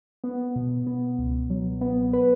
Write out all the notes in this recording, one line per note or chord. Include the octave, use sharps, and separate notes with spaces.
B3
B2
B3
C#2
F#3
B3
B4